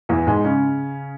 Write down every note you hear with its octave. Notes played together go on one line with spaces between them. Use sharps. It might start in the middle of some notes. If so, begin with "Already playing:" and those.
E2 E3
G#2 G#3
C#3 C#4